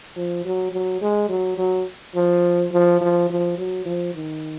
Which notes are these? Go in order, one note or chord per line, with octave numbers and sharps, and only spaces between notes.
F3
F#3
F#3
G#3
F#3
F#3
F3
F3
F3
F3
F#3
F3
D#3